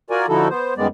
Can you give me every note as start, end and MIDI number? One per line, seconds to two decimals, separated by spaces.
0.10 0.26 65
0.10 0.26 66
0.10 0.26 70
0.10 0.26 74
0.10 0.26 80
0.29 0.48 50
0.29 0.48 53
0.29 0.48 63
0.29 0.48 64
0.29 0.48 66
0.29 0.48 69
0.50 0.74 59
0.50 0.74 72
0.78 0.87 42
0.78 0.87 51
0.78 0.87 55
0.78 0.87 56
0.78 0.87 59
0.78 0.87 74